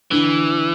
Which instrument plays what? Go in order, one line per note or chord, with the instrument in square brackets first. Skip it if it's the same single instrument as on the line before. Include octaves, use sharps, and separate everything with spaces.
[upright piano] D3 [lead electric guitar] E3